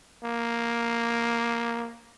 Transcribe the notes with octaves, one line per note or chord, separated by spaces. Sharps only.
A#3